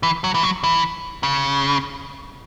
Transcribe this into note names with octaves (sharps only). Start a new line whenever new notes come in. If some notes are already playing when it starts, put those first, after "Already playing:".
E3
F#3
E3
F#3
E3
C#3